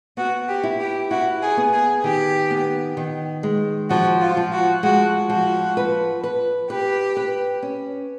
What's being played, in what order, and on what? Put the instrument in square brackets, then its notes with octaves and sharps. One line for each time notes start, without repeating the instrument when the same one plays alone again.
[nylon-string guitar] B3 [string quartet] F#4
[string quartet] G4
[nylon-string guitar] E4
[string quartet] G4
[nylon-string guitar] E4 [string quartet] F#4
[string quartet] G#4
[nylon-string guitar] B3
[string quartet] G#4
[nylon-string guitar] D#3 [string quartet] G4
[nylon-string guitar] B3
D#3
G#3
[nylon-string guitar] F3 [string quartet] F#4
[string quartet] F4
[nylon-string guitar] F3
[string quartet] F#4
[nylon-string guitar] G#3 [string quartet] F#4
[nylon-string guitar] F3 [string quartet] F#4
[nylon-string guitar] B4
B4
[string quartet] G4 [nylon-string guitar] B4
[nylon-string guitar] B4
C#4